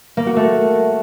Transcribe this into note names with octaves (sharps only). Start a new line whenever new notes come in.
A#3
F#4
A3